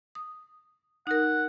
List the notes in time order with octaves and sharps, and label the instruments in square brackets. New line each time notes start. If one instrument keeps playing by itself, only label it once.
[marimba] D#6
[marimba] D#4 A#4 [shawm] F#5